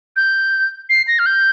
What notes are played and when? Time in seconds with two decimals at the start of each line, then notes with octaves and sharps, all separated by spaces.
0.16 G6
0.89 C7
1.07 A#6
1.19 F6
1.26 G6